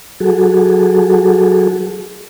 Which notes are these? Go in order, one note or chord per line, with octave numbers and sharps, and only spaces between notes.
F#3 F#4 G#4 A4